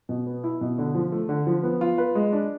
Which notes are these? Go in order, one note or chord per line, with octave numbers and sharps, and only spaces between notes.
B2
B3
E4
B2
D3
F3
A3
D3
F3
B3
F4
B4
G#3
D4